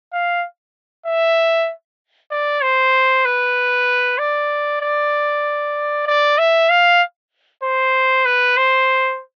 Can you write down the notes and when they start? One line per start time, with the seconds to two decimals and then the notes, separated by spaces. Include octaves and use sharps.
0.13 F5
1.06 E5
2.31 D5
2.63 C5
3.25 B4
4.18 D5
4.82 D5
6.07 D5
6.38 E5
6.69 F5
7.63 C5
8.25 B4
8.57 C5